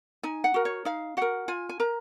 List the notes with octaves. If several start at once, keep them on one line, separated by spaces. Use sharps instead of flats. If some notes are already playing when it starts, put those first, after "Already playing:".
D#4 G#5
F#5
F#4 A#4
C#5
D#4 F5
F#4 A#4 F#5
F4 G#5
G#5
A#4 A#5